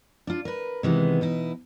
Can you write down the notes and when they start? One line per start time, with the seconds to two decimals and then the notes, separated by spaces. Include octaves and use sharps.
0.27 D4 F4
0.45 A#4 B4
0.83 C3 D#3 E3 G#3 B3
1.21 B2 D#4 E4